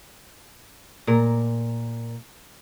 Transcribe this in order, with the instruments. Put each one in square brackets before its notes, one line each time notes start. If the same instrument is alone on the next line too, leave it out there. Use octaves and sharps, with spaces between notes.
[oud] A#2 A#4